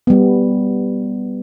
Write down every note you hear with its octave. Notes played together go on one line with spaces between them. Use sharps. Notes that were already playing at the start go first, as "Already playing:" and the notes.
G3 B3